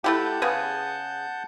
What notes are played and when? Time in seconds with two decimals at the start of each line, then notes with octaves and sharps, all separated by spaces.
0.04 A3 E4 G4 F#5 A5 G6
0.42 C#3 B3 G#4